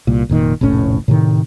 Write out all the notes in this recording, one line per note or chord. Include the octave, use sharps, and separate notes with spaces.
C2 A#2
F1 A#2 D#3
F1 A#1 A2 C#4
A2 C3 D#3